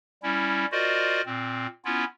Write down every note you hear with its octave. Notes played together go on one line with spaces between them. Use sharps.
G3 C#4 E4
F4 F#4 A#4 C5 D5 D#5
A#2 C4
B3 C#4 E4 F4